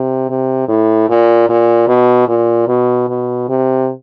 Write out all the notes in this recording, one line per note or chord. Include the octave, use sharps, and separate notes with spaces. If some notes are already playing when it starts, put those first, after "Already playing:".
Already playing: C3
C3
A2
A#2
A#2
B2
A#2
B2
B2
C3